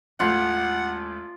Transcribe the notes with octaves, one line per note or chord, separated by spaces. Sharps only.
A1 D#2 A2 G#3 F4 F#5